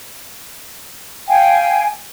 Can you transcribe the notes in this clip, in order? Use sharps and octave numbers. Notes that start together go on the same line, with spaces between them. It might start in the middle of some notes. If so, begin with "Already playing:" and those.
F5 G5 G#5